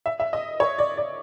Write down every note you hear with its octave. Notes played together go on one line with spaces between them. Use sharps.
E5
E5
D#5
C#5
D5
D5